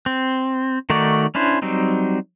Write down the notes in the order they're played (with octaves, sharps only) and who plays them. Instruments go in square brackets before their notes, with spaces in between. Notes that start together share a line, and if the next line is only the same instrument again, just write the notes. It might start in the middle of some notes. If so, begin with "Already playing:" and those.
[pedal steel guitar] C4
D#3 A3 D#4 F#4 D5
C#4 D4 E4 C5
F#3 G3 C4 D#4